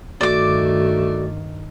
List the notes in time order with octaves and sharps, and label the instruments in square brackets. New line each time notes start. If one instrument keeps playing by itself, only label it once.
[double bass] G2 D#3 [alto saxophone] A3 [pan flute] F#4 [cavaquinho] D5 D6